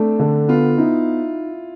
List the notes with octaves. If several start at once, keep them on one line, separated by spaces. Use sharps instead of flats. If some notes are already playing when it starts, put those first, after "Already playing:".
Already playing: A3 C4 D4
D3
B3 F4
D#4 E4